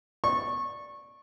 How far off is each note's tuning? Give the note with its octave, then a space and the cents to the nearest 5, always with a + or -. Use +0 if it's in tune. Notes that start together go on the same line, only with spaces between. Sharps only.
D5 +0 C#6 -20